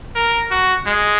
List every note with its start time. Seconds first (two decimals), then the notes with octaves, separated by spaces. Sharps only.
0.16 A#4
0.51 F#4
0.86 G#3